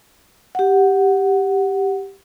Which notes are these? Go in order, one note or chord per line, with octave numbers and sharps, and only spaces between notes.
G4 F#5